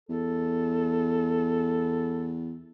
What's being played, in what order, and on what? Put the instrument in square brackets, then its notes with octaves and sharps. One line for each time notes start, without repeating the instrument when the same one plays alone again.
[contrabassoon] E2 [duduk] A4